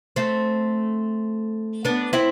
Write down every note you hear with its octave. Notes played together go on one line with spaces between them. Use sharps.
A3 C4
B3 D4
C4 E4